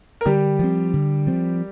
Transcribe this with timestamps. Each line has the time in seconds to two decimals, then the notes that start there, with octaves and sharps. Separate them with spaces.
0.21 A#4
0.25 D3 G3 G4
0.59 F3 C4
0.94 D3
1.27 F3 C4